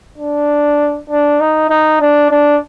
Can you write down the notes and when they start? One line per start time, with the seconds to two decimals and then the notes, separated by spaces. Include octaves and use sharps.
0.18 D4
1.09 D4
1.40 D#4
1.70 D#4
2.01 D4
2.31 D4